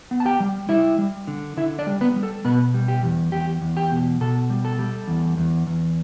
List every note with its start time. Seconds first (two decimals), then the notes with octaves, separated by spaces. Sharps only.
0.11 B3
0.20 A5
0.25 G4 G5
0.40 G3
0.69 G3 E4 E5
0.98 G3
1.27 D3
1.57 D3 E4 E5
1.79 D4 D5
1.87 G3
2.01 B3 B4
2.16 G3
2.23 A4
2.45 B2 B3 B4
2.74 G3
2.88 G4
3.03 E2
3.32 E2 G4
3.61 E2
3.77 G4
3.91 B2
4.21 B2 A4
4.50 G3
4.65 A4
4.79 G3
5.08 E2
5.37 E2
5.67 E2